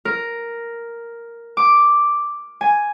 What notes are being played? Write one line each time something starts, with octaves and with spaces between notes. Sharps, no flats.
A#4
D6
G#5